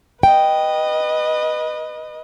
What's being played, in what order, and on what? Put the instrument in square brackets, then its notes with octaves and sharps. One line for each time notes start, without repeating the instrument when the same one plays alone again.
[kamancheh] B4 D#5 [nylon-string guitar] G5